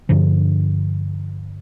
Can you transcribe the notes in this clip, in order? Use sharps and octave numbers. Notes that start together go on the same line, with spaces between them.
G2 D3 F3